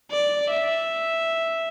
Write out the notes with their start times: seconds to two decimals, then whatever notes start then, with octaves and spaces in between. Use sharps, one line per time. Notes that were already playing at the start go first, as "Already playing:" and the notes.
0.11 D5
0.50 E5